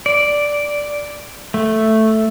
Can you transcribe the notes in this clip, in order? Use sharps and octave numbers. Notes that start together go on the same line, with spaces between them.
D5
A3